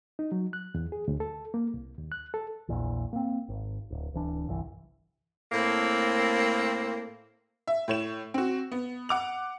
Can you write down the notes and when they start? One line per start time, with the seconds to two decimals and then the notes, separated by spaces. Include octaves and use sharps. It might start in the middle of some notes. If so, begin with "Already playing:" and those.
0.19 D#4
0.32 F#3
0.53 F#6
0.74 E2
0.92 G#4
1.08 D2
1.20 A4
1.54 A#3
1.74 C2
1.98 D#2
2.12 F#6
2.34 A4
2.69 A#1 E2 A#2 E3
3.13 A#3 C4
3.48 G#1
3.90 D1
4.14 D1 E3 D4
4.48 G1 C2 E3
5.52 A2 A#3 C4
7.68 E5
7.88 A2 C#5 E7
8.34 C4 F#4
8.72 B3
9.09 F#5 D6 F7